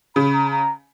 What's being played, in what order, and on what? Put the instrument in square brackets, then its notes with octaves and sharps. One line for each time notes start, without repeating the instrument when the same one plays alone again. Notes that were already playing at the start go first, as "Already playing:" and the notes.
[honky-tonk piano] C#3 [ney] B5
[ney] A#5
A#5